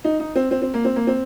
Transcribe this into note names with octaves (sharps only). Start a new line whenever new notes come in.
D#4
D#4
C4
C4
C4
A#3
C4
A#3
C4